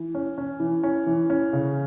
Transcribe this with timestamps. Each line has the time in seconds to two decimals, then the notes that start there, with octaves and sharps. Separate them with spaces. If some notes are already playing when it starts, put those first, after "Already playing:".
Already playing: E3
0.15 C#4
0.38 C#4
0.60 E3
0.83 C#4
1.07 E3
1.30 C#4
1.53 C#3